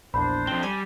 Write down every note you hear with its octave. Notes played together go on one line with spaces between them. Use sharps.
A#1 E2 D4 C5 B5
F2 C4 G7
G3 G#5